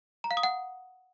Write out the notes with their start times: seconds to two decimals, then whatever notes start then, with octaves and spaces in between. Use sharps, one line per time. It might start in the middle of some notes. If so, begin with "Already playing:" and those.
0.24 A#5
0.31 F5
0.37 D#6
0.43 F#5